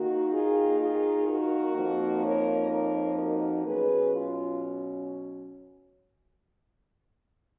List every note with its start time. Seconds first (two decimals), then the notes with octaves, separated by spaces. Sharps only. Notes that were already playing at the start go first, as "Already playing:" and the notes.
Already playing: D#3 A#3 D#4 F#4
0.32 F4 G#4
0.79 F4 G#4
1.27 F#4 A#4
1.75 F2 F3 A#3 D#4
2.23 A#4 C#5
2.70 A#4 C#5
3.17 F#4 A#4
3.65 B2 F#3 C#4 G#4 B4
4.14 F4